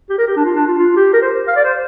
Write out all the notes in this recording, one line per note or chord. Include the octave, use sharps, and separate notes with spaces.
G4
A#4
G4
D4
F4
D4
F4
F4
G4
A#4
C5
F5
D5
C5